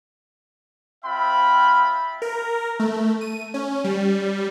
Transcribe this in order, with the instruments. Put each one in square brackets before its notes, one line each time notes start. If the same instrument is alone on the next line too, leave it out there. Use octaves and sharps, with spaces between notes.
[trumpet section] C4 F4 E5 G5 B5
[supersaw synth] A#4
A3
D#7
C#4
G3